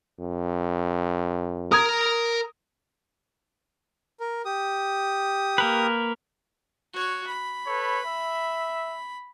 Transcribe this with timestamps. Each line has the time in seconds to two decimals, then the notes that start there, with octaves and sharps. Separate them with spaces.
0.20 F2
1.72 A#4 A#5 D#6 G#6
4.20 A#4
4.45 G4 D#6
5.58 A#3 A#4 B4
6.93 F#4 C#5
7.27 B5
7.67 A4 B4 C#5
8.06 E5